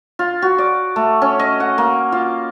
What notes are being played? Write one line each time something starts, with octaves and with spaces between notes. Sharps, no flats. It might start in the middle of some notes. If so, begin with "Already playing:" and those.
F4
F#4
D5
A3
C#4
D#5
F#5
A#3
F4